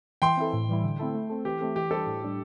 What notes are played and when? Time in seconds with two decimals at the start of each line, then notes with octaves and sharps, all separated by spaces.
0.22 E3 G5 C6
0.37 C4 E4 A4
0.53 A2
0.69 E3 G3 E4
0.84 D3
0.99 A3 C4 E4 A4
1.14 A3
1.30 C4 A4
1.45 E3 G4
1.60 A3 C4 A4
1.76 E3 G4
1.91 G3 D4 A4 C5
2.07 A2
2.22 G3 D4 G4